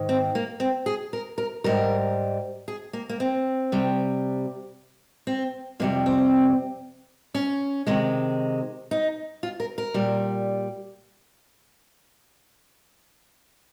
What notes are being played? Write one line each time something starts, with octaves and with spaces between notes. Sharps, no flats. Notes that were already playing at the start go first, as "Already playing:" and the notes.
Already playing: G#2 D#3
C4
A#3
C4
G#4
A#4
A#4
G#2 G3 A#4
G#4
A#3
A#3
C4
C3 G3
C4
F2 C3 G3 A#3
C4
C#4
C3 D#3 G#3
D#4
F4
A#4
A#4
A#2 G3